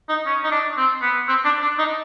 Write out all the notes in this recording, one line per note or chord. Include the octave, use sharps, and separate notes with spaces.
D#4
C#4
D#4
D4
C4
B3
C4
D4
D4
D#4